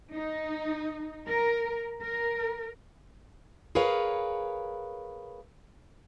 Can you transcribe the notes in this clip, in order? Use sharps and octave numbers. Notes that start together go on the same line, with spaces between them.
D#4
A#4
A#4
G#4 A#4 B4 C#5 F5